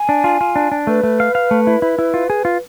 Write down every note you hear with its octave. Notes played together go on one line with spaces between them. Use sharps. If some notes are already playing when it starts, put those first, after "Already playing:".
Already playing: G#5
D4
F4
F4
D4
D4
A3 B4
A3
F5
F5
A3
E4
E4
E4
F4
G#4
F4